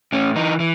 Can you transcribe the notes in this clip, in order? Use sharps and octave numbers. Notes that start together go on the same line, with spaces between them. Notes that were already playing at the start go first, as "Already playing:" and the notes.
A2 C#4
E3 D#4
E3